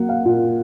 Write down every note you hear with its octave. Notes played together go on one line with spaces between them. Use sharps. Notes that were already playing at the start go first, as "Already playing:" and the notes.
Already playing: F#3 A#3 F#5
F5
A#2